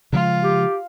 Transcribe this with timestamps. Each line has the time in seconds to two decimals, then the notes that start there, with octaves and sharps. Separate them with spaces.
0.13 C#3 F3 G#3 F4
0.43 G4